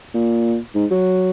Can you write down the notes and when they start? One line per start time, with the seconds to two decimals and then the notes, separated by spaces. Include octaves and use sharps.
0.14 A#2
0.75 G#2
0.91 F#3